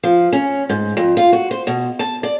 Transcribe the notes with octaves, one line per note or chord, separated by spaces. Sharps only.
F3
C#4
G#2
F2
F4
F#4
C5
B2
A5
D5